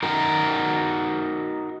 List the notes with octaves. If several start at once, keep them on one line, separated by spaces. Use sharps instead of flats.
D#4 F#4 A#4